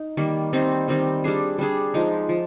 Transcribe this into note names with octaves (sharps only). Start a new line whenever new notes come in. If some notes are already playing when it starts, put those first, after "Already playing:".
Already playing: D#4
D#3 G3 A#3
D#3 G3 C4 D#4
D#3 G3 C4 D#4
G3 D4 G#4
G3 D4 G#4
F3 G#3 D#4
F3